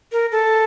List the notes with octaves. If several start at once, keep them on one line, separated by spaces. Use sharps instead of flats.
A#4
A4